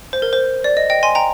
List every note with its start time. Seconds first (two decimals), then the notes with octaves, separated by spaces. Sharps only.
0.13 C5
0.22 A#4
0.33 C5
0.64 D5
0.77 D#5
0.90 D#5 G5
1.03 G#5 C6
1.15 G5 A#5